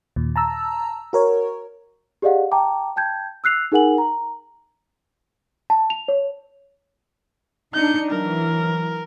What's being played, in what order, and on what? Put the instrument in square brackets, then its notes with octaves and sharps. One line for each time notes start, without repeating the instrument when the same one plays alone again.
[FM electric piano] D#2 A#2
A5 A#5 E6
F#4 A#4 C#5
[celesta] G4 G#4 D5 D#5 F5 F#5
G5 A5 A#5 D6
G5 A5 G6 G#6
E6 F#6 C7 F7
D#4 G#4 A#4 F#5 G#5 F#7
A#5
A5
F7
C#5
[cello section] D4 D#4 [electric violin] G6 C#7
[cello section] E3 F#3 [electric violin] A#4